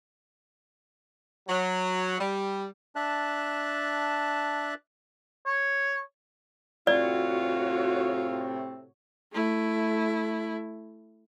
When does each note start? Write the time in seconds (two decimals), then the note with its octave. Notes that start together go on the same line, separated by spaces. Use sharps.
1.48 F#3
2.19 G3
2.96 D4 E5 A5 F#6
5.46 C#5
6.87 A2 C3 C4 F4 F#4 C#5 D5
9.33 A3 E4